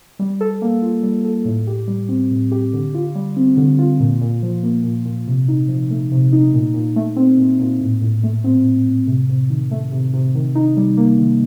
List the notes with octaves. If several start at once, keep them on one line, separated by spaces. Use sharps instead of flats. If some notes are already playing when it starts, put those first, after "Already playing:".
G3
A4
A#3
F4
G3
A4
A2
G4
G3
C4
A2
G4
D3
F4
G3
C4
D3
F4
A#2
A#2
F3
A#3
A#2
A#2
C3
D#4
F3
A3
C3
D#4
A#2
A#2
A3
C4
A#2
A#2
A2
A2
A3
C4
A2
A2
C3
C3
D#3
A3
C3
C3
D#3
D#4
G3
A#3
D#3